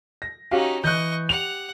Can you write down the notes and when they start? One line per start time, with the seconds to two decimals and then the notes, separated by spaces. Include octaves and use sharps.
0.22 A#6
0.51 C#4 D#4 F#4 G4 F5
0.84 E3 D#5 C#6 F#6 G6
1.29 G4 F#5 F7